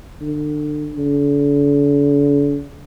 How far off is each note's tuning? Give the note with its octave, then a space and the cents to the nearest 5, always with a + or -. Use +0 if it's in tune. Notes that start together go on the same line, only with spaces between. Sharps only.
D3 +30
D3 -45